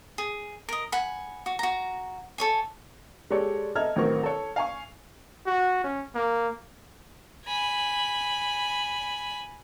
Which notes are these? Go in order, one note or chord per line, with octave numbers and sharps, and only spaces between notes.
G#4
A#4 D#5
F#5 G#5 B5
F#4
F#4 A#5
A4 C#5 G#5
G#3 G4 A4 C#5 D5
A4 D#5 E5 A#5 F6 G#6
A1 D#3 F#3 C4 A#4 C#6
A4 C#5
F5 G#5 C#6
F#4
C#4
A#3
G#5 B5